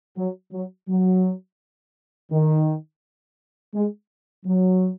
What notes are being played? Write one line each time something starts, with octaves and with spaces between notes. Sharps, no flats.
F#3
F#3
F#3
D#3
G#3
F#3